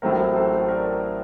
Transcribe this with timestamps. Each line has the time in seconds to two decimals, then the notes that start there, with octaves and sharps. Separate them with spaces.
0.02 A1 A2 F#3 A3 C4 A#4
0.36 A4 C5
0.69 A#4 D5